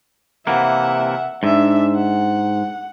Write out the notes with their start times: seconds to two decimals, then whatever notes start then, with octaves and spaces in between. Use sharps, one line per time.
0.47 C3 E3 A#3 E5 F#5
1.43 G#2 D4 E5
1.96 F#5